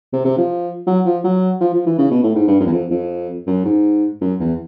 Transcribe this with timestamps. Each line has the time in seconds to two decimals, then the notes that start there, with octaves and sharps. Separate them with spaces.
0.13 C3
0.25 C3
0.37 F3
0.87 F#3
1.05 F3
1.24 F#3
1.60 F3
1.74 F3
1.86 E3
1.98 C#3
2.11 B2
2.23 A2
2.35 G#2
2.47 G2
2.60 F#2
2.66 E2
2.72 F2
2.91 F2
3.47 F#2
3.65 G#2
4.21 F#2
4.40 E2